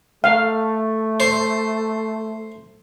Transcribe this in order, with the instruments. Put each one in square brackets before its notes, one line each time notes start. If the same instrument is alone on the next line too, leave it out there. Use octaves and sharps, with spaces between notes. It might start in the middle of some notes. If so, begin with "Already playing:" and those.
[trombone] A3 [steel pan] F5
[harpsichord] C5